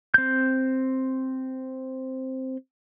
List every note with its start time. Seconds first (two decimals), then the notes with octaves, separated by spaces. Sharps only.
0.14 C4 G6